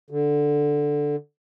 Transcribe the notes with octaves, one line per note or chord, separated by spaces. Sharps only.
D3